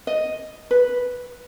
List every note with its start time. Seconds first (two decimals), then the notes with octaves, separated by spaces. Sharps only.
0.07 D#5
0.71 B4